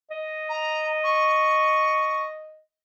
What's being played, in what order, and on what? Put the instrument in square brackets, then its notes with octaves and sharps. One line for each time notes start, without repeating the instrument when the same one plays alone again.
[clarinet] D#5
[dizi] A#5
C#6